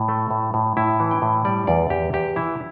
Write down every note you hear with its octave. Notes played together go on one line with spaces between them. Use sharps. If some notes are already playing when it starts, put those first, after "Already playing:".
Already playing: A2
A3
A2
A2
A2 E4
E3
G5
A2
G3 D5
E2 D5
E2 G4
E2 G4
E3 E4